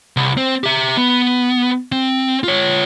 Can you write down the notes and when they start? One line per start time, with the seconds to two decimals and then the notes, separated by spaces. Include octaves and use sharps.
0.17 C2
0.37 C4
0.64 G4 E5
0.97 B3
1.92 C4
2.44 F4 C#5